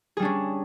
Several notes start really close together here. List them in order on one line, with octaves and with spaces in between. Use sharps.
G#4 G3 D4 C#4